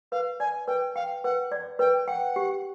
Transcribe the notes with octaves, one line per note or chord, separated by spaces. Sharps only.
B4 F5
D5 G#5
B4 G5
F5 G5
B4 F#5
D5
B4 G5
F#5 G5
G4